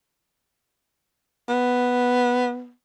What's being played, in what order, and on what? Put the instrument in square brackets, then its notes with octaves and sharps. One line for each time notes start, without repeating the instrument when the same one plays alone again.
[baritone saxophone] B3